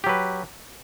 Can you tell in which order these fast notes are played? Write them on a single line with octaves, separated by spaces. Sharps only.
G4 F#3 B4